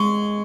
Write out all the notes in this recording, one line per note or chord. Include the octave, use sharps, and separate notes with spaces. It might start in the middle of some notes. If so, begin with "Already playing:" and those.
Already playing: G#3 C#6